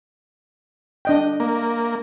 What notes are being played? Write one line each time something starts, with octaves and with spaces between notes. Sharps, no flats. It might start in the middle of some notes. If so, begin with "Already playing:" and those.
D4 D#5 G5
A#3